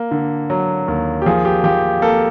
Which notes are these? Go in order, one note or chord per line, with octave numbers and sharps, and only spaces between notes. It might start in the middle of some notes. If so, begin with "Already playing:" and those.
Already playing: A#3
D3
F#3
D#2
G4
F3 G#4
G4
F3 G4
A#3 A4